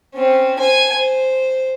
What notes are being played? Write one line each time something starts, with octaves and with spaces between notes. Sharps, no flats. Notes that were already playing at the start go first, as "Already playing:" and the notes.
C4 C#4
C5 G#5
C5